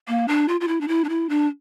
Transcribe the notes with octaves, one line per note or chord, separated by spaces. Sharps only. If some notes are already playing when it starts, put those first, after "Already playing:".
A#3
D4
F4
F4
E4
D4
E4
D4
E4
D4